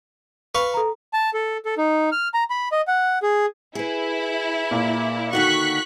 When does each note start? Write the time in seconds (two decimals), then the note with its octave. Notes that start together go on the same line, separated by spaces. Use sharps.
0.55 B4 F5 C#6
0.74 A4 A#5
1.13 A5
1.34 A4
1.65 A4
1.78 D#4
2.12 F6
2.34 A#5
2.50 B5
2.72 D#5
2.88 F#5
3.23 G#4
3.75 E4 G#4 B4
4.71 A#2 A#3
5.33 D3 D#3 A#3 F#4 C#6 F#6 B6